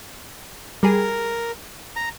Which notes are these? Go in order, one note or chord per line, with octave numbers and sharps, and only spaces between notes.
G3 G#4 A#4
A#5